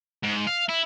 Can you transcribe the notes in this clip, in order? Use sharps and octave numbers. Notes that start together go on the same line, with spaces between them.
G#2
F5
E4